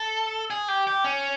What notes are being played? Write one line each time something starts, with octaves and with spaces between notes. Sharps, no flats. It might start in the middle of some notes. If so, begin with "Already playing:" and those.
Already playing: A4
G#4
G4
G4
C#4